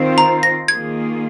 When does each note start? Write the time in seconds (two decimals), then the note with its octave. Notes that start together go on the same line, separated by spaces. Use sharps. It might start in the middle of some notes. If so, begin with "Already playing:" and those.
Already playing: D#3 C4 F4 C5
0.18 A#5
0.43 A#6
0.68 D#3 A#3 F4 G#4 G#6